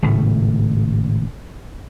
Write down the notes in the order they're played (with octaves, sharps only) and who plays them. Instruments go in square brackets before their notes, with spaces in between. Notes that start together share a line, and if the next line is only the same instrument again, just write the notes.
[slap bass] G#1 A2 C#3 A3